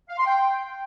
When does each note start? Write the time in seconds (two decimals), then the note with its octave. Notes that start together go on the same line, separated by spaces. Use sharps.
0.09 F5
0.18 C6
0.26 G5